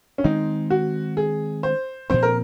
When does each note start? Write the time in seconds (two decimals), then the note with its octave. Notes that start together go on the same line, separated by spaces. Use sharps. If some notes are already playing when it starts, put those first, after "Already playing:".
0.18 C#4
0.24 D#3 G#3 C4 D#4
0.70 F#4
1.17 G#4
1.63 C5
2.10 A#2 F3 C4 C5
2.23 A#4